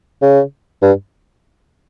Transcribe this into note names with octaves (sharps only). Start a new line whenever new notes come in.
C#3
G2